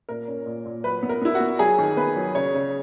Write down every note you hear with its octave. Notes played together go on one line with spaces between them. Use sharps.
A#2 A#4
C#4
A#2
A#2
F#3 B4
B3
A#4
B3 E4
F#4
B3
F#3 G#4
D#3
B3 B4
F#3
C#3 C#5
C#3